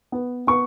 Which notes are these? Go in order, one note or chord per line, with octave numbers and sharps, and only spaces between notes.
B3
B3 C#6